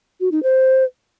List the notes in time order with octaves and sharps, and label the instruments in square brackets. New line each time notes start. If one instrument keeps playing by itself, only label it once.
[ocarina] F#4
D#4
C5